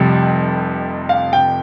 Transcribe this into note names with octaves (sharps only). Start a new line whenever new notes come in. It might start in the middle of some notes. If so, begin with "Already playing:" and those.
Already playing: F1 F2 C3 G3
F5
G5